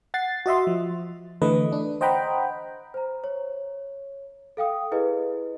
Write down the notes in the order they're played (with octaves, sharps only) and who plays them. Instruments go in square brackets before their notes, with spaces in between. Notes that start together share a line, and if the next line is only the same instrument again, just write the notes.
[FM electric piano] F#5 A6 C7
F#4 D#5 E5 C6
F3
D3 E3 A3 B4 D#5
D4
C5 D#5 F#5 G5 A#5 B5
[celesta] C5 A#5
C#5
A4 F5 G5 D#6
E4 G#4 B4 D#5